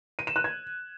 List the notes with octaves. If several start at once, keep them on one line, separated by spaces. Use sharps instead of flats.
D#7
E7
F#6
G#6